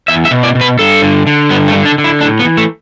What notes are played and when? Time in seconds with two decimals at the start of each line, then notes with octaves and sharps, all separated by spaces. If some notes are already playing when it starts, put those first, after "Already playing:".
0.08 E2 E5
0.25 E5
0.31 B2
0.43 D5
0.55 B2
0.61 B4
0.79 G2 A4
1.02 D3
1.27 D3
1.50 G2 B3
1.68 A3
1.73 D3
1.85 D4
1.98 D3
2.04 E4
2.21 A2 D4
2.39 B3
2.45 E3
2.57 A3